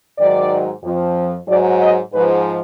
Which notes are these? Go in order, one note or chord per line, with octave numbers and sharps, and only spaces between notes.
G#2 D#3 F#3 D5
F2 F3
G#2 F#3 D5
D#5
G#2 F3 B4